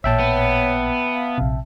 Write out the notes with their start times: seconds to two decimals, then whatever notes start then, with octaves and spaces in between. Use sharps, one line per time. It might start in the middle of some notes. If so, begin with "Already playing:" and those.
0.04 A1 A#2 C#5 E5 G5 A5
0.20 B3
1.13 F5
1.38 A#1 C3